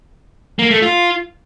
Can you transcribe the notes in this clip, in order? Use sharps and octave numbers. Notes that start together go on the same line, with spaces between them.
A#3
A3
F4